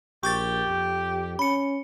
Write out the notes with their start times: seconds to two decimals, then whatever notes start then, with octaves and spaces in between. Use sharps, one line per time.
0.23 A#1 G4 C#6 G6 A6
0.68 F2
1.39 C#4 B5 C#7